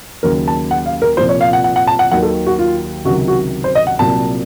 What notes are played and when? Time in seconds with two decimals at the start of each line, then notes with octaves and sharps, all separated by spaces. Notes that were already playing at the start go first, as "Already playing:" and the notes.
0.23 D#2 C#3 F#3 A#4
0.48 A5
0.71 F#5
0.86 F5
1.02 A#4
1.17 C2 A#2 F3 C5
1.29 C#5
1.41 F5
1.53 F#5
1.64 F#5
1.76 F#5
1.87 A5
1.99 F#5
2.11 D#2 D#3 F#3 F#5
2.23 A4
2.47 F#4
2.59 F4
3.05 C#2 C3 D#3 F#3 F#4
3.28 F#4
3.64 C5
3.75 D#5
3.87 F#5
3.99 C2 A#2 F#3 A5